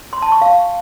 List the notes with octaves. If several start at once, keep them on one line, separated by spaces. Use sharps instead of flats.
C6
A5
C#6
F5